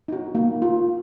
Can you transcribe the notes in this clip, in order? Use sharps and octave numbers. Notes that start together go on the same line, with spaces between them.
D#4 F#4
A#3
F4